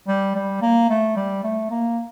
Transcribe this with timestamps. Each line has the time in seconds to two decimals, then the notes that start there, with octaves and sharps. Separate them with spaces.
0.08 G3
0.35 G3
0.62 A#3
0.90 A3
1.16 G3
1.44 A3
1.70 A#3